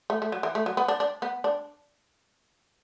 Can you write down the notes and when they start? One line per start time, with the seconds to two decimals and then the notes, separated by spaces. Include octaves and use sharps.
0.10 A3
0.22 A3
0.32 F#3
0.43 E3
0.55 A3
0.66 F#3
0.77 B3
0.88 D4
1.00 D4
1.22 B3
1.44 D4